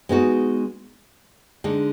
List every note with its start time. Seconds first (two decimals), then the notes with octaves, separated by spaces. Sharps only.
0.09 G#3 B3 D#4 F#4
1.64 D3 G#3 D#4